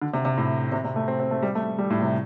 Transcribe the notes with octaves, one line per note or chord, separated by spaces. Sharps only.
D3
C3
C3
A2
C3
C3
A3
C4
C4
A3
G3
A3
G3
A2
C3